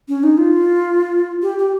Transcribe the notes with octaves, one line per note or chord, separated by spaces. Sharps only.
C#4
D#4
F4
G4
G4